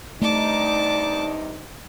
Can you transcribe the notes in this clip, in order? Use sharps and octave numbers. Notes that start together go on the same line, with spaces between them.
G2 C3 A3 D#4 D5 A5 D6